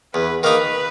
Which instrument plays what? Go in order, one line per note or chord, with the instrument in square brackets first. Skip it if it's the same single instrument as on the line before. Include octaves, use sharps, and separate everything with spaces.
[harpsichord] E2 [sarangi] B4
[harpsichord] D#3 A#3 D#4 [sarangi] B4